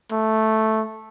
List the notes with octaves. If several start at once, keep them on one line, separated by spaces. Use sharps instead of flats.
A3